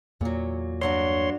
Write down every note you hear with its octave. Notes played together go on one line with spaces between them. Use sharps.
E2 A#2 F#3 A#3
G2 F#3 D4 C#5 C6